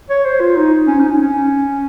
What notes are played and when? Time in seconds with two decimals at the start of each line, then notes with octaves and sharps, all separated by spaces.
0.10 C#5
0.25 C5
0.40 F4
0.56 D#4
0.87 C#4
1.00 D#4
1.11 C#4
1.22 C#4